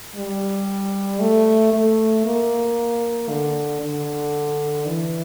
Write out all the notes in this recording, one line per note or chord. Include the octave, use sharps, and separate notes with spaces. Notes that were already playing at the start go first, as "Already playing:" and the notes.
G3
A3
A3
A#3
D3
D3
E3